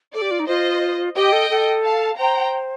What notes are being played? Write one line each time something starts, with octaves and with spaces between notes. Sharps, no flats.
A4 D5
G4
F4
D#4
F4 C5 D#5
G4 D#5 G5
A4
A4
F5 A5
C5 G5 A#5